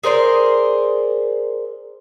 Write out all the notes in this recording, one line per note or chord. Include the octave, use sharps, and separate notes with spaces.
G#4 A#4 C5 D5